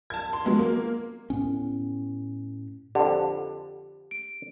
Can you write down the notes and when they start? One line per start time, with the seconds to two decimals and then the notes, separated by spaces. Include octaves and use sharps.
0.10 A5 G#6
0.33 C6
0.45 F3 F#3 G#3 B3
0.59 A#3
1.30 A2 B3 C#4
2.95 F2 D3 G4
4.11 D7